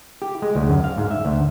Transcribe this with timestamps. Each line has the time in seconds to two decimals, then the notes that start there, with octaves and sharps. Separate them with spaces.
0.22 G4
0.42 G#3
0.55 D2
0.69 F#2
0.84 F5
0.97 G#2
1.11 E5
1.25 D2